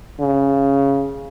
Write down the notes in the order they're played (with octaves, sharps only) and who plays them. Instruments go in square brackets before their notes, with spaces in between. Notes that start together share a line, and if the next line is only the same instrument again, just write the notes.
[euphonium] C#3